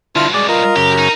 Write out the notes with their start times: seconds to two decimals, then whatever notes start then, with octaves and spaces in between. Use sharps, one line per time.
0.15 G2 B2 D3 E4 F4
0.34 G#3 D5
0.49 F4 A#4 D#5
0.76 F#2 C#3 G4
0.98 D#4